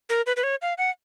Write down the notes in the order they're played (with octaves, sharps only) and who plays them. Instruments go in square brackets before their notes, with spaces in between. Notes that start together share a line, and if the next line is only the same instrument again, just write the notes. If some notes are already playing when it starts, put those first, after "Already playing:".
[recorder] A#4
B4
B4
C#5
F5
F#5